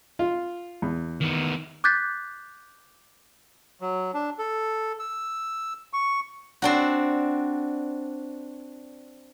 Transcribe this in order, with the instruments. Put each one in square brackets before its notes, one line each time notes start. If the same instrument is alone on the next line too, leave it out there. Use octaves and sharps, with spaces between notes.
[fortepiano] F4
E2
[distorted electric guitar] D#3 B3
[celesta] D6 F#6 G6 A6 B6
[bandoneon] F#3
D4
A4
E6
C#6
[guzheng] C4 D4 F#4